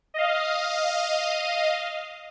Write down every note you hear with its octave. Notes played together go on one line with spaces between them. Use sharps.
D#5 F5